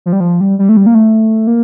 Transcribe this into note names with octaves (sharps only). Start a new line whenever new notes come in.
F3
G3
F3
G3
G3
A3
G3
A#3
A3
A#3